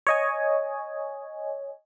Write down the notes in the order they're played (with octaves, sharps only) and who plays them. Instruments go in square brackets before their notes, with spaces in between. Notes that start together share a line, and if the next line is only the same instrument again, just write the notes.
[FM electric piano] C#5 D#5 G#5